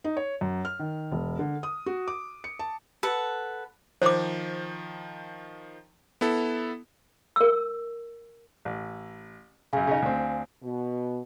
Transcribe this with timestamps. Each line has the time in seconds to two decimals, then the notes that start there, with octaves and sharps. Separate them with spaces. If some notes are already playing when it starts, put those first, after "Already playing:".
0.04 D#4
0.17 C#5
0.41 F#2
0.65 F6
0.79 D#3
1.12 E1
1.39 D3
1.63 D#6
1.86 F#4
2.08 D6
2.44 C#7
2.59 A5
3.03 A4 B4 F#5
4.02 D#3 F3 C5 D6
6.21 B3 E4 A4
7.36 A#4 E6
8.65 A1
9.73 F#2 C#3 F5 G#5
9.87 C#3 D#4
10.02 D2 C4
10.62 B2